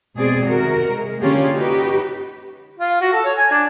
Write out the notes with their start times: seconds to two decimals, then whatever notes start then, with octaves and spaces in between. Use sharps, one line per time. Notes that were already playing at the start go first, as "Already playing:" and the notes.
0.16 B2 G#3 C4 G#4 D5
0.46 C3 D#3 F#4 A#4
0.88 G#3
1.20 D3 A#3 C#4 F4 G4 G#4
1.53 D#4 F#4 G4 B4
2.79 F4
3.01 F#4
3.13 A4
3.25 C#5
3.37 G#5
3.51 D4